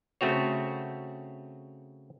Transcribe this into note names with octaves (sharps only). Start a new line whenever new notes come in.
C#3 A3 C4 F#4 C#5